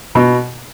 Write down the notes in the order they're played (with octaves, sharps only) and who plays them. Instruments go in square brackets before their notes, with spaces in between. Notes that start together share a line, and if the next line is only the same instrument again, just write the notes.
[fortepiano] B2